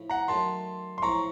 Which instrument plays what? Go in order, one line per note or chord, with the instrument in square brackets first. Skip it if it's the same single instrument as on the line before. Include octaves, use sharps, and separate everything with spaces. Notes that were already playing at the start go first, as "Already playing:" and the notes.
Already playing: [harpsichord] A2 F3
[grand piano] F#5 A#5
[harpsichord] D#3 F#3 A3 [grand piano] A5 C6
[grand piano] C6
[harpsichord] A2 F3 C4 [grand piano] A#5 C#6